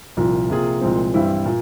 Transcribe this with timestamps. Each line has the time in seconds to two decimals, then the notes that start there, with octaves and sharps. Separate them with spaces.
0.17 C2 A#2 F3
0.50 C3 F3 A#3 F4 G#4
0.81 C2 A#2 F3 G#3 C4
1.14 G2 E3 G3 C4 E4
1.45 A#2